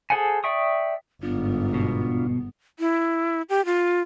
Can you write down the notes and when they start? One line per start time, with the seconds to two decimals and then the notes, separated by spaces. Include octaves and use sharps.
0.10 G#4 A4 C5 F#5 G#5
0.44 D5 E5 G5 C#6 D#6
1.23 G1 G#2 B3 D4 F4
1.74 B2
2.79 E4
3.49 G4
3.65 F4